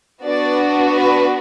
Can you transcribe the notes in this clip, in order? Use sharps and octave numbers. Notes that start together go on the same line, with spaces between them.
B3 D4 F#4 D5
B4